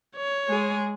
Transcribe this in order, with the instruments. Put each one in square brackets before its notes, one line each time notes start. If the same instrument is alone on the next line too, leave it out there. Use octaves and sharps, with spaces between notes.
[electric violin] C#5
[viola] G#3 G#4